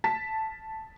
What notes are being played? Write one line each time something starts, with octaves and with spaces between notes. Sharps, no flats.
A5 B6